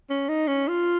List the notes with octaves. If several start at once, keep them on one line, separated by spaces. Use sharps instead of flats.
C#4
D#4
C#4
F4